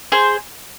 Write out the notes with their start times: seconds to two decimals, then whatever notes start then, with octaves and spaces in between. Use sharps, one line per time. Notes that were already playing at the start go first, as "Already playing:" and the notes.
0.12 G#4 C5